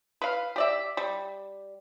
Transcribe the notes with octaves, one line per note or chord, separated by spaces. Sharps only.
B4 F5
G4 D5 E5
G3